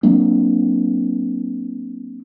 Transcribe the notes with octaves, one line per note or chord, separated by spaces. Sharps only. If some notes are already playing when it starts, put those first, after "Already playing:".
F#3 A#3 C4 D4